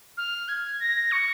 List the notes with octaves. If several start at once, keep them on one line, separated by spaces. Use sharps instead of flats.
F6
G#6
A#6
C#6